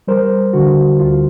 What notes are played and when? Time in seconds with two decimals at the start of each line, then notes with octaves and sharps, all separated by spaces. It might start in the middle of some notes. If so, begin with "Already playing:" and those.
0.08 G3 A#4 C5
0.53 D3 F#4
0.99 D2 F4